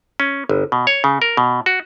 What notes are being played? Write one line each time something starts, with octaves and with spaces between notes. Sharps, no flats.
C#4
G1
B2
C#5
C#3
A#4
B2
F#4